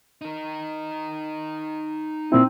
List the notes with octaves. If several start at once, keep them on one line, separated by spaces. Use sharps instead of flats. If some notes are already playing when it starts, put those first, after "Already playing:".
D#4 A#4
A#2 C4 E4